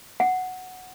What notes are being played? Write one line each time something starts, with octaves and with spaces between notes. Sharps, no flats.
F#5